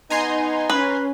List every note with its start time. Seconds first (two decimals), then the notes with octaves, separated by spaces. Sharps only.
0.10 B3 D#4 G#5 A#5 C6
0.70 C#4 B4